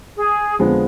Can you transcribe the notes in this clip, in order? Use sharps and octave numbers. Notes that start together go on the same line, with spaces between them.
G#4
F2 D3 F3 G#3 B3